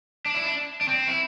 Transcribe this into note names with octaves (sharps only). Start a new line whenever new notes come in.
D4
E4
D4
D4
C4
E4